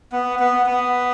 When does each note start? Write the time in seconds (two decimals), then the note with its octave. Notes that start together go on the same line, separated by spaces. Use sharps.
0.12 B3
0.39 B3
0.66 B3